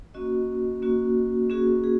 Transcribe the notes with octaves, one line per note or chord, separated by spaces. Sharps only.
A#3 C#4 F#4 D#5
A#3 C#4 F#4
A#3 C#4 F#4 G#4
G#4
G#4